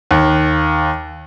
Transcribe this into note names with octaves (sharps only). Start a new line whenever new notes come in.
D#2